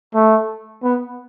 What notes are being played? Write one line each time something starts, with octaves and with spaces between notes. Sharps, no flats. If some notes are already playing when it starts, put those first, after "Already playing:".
A3
B3